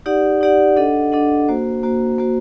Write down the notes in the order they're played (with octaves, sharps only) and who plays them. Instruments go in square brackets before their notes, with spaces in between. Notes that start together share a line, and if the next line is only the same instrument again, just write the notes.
[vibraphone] D#4 G4 D5 F#5
D#4 G4 D5 F#5
D4 A4 D#5 F#5
D4 A4 D#5 F#5
A#3 F#4 C5
A#3 F#4 C5
A#3 F#4 C5